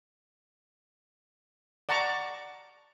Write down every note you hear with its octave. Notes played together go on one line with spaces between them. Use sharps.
D5 F#5 A5 A#5 C#6 D6